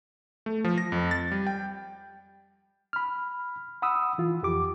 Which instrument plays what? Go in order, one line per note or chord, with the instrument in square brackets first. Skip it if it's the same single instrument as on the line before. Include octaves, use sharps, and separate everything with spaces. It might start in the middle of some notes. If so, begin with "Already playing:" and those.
[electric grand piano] A3
F3
A#6
F2
A6
G3
G5
[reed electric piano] B5 F6
F#5 B5 D#6 E6
E3 F4
F2 G4 D6